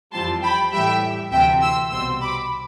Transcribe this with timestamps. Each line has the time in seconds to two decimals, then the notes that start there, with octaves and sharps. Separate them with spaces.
0.13 F2 E3 G3 C4 F4 A5 C6
0.43 G5 B5
0.73 A2 E3 G3 E5 G5
1.32 D2 C3 E3 E5 G5
1.62 C6 E6
1.91 C2 B2 G3 C4 C6 E6
2.22 B5 D6